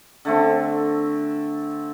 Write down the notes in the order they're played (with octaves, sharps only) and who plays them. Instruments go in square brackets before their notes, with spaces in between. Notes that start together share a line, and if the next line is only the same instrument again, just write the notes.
[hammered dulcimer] D3 A3 C4